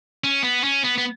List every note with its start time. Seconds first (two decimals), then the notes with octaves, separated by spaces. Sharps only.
0.24 C#4
0.44 B3
0.64 C#4
0.84 B3
0.98 B3